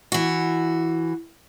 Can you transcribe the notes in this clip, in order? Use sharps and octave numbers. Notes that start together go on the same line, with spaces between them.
E3 F#4